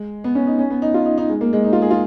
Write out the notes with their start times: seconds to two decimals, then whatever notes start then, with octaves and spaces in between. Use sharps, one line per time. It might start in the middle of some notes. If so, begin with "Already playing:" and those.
Already playing: G#3
0.24 B3
0.35 C#4
0.47 D#4
0.59 C#4
0.70 B3
0.82 D#4
0.94 F4
1.06 D#4
1.18 D#4
1.29 G#3
1.41 A#3
1.53 G#3
1.64 D#4
1.73 F4
1.82 G#4
1.91 F4